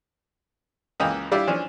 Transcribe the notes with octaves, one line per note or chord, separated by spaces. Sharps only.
C#2 E3 A#3 D#5 G5
G3 D4 E4 F4 G4 D5
E3 F3 C#4 D4